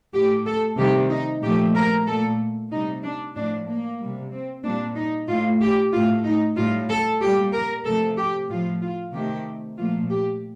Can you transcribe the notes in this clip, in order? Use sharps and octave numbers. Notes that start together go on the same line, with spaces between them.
A2 A3 G4
A4
C3 D#3 G3 G4
D#4
A#2 F3 A3 G4
A#4
A#2 A3 A4
C3 G3 D#4
D4
A2 F3 A3 D4
A#3
C3 G3
C4
A#2 G3 D4
D#4
A2 A3 F4
G4
A2 A3 F4
D#4
A2 G3 F4
A4
A#2 G3 G4
A#4
C3 F3 A3 A4
G4
A2 F3 A3 F4
F4
C3 D#3 A3 G4
A#2 F3 A3 F4
G4